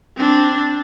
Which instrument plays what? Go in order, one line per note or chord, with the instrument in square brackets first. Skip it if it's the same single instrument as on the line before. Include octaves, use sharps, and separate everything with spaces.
[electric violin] C4 D4